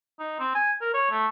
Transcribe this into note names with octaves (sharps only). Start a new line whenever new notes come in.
D#4
C4
G#5
A#4
C#5
A3